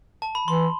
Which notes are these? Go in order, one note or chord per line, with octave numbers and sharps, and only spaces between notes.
A5
B5
E3 C6